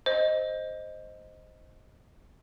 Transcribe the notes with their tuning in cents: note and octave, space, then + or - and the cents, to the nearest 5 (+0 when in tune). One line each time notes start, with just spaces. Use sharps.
C5 +0 D#5 +0